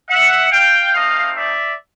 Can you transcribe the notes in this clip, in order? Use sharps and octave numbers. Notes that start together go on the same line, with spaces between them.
E5 F#5
F5 G5
A3 C4 D#4 D#5 F5
D5 E5